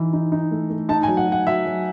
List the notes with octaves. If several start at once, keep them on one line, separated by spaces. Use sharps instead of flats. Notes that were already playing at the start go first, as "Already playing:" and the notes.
Already playing: E3 D#4
D#4
D#4
A3
A3
D#4 A5
G#5
F#3
F#5
F#3
F#5
F#3 E5
F#3